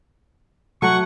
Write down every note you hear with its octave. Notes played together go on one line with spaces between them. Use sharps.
F#3 A3 F#5 C#6